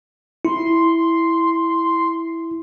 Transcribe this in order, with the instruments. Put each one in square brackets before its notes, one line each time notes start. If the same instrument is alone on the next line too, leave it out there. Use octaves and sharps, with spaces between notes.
[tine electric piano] E4 [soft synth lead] C6